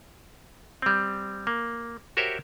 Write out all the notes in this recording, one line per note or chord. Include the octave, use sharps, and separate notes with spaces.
G3 C4
A#3
F#4 G4 A#4 C5 C#5 E5